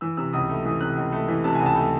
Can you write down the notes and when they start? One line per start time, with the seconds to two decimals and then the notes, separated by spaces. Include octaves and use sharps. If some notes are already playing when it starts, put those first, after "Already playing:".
0.01 E3 E6
0.17 C3 E6
0.33 C#2 D#6
0.49 A3
0.65 E3 D#6
0.81 C3 F#6
0.97 C#2
1.12 A3
1.28 E3
1.44 C3 A5
1.55 G#5
1.60 C#2
1.66 A5
1.76 A3